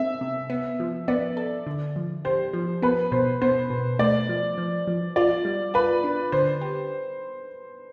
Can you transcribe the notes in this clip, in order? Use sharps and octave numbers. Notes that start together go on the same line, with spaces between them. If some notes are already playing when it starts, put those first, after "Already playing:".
Already playing: C4 E5
C3
B3
F3
B3 D5
A4
D3
F3
G4 C5
F3
B3 B4
B2 C5
B3 C5
B2
A3 D5
F3
F3
F3
F4 D5
G3
F4 B4
D4
D3 C5
G4